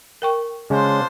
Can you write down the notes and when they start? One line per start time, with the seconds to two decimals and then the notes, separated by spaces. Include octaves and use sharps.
0.22 A#4 G5 C#6
0.70 C#3 G#3 C#4 D4 F4 C5